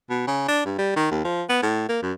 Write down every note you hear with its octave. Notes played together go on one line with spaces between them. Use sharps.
B2
C#3
D4
G2
G3
D#3
D#2
F3
B3
A2
A#3
F#2